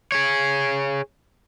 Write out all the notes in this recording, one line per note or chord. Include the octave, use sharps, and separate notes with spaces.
G#4 C#5